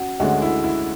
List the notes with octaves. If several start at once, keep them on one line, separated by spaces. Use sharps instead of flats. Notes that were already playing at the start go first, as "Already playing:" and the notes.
Already playing: C#4 F#4
D2 D3 G#3 C#4 F#4
E4
E4